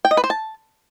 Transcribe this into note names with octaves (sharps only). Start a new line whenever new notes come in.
G5
D#5
B4
C5
A5